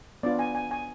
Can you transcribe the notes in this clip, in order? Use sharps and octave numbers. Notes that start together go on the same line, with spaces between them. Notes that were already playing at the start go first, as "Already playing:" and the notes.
B3 D4 F4 D5
G#5
G#5
G#5